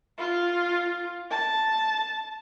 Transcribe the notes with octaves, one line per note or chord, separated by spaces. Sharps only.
F4
A5